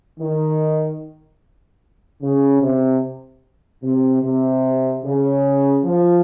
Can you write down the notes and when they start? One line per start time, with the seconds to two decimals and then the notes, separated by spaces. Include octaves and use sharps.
0.19 D#3
2.22 C#3
2.61 C3
3.83 C3
4.23 C3
5.04 C#3
5.85 F3